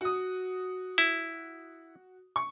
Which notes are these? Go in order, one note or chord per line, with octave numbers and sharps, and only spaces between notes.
F#4 D#6
E4
C#6